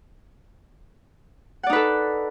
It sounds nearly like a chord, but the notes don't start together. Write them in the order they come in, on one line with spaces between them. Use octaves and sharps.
F#5 D5 D#4 B4 A4